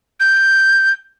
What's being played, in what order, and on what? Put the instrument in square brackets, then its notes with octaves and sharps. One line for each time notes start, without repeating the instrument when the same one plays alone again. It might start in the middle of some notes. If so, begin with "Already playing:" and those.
[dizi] G6